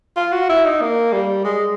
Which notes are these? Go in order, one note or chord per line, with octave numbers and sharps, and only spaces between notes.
F4
F#4
E4
D#4
A#3
G3
G#3